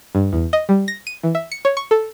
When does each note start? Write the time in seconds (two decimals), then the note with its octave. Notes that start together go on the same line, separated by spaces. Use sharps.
0.15 G2
0.33 E2
0.53 D#5
0.69 G3
0.88 A#6
1.07 D#7
1.23 E3
1.35 E5
1.52 C#7
1.65 C#5
1.77 C#6
1.91 A4